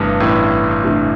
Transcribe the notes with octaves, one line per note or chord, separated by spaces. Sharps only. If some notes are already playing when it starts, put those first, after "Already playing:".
Already playing: G1 G2 C3 E3 A3 D4
A1 A2
C3 E3 A3 D4